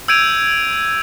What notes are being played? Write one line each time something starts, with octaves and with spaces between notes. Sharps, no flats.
E6 G6 G#6 D7 D#7 F7